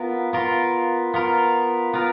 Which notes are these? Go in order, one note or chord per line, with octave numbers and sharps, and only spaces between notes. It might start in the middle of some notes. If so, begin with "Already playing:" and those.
Already playing: B3 F4 A#4
B3 F4 A#4
B3 F4 A#4
B3 F4 A#4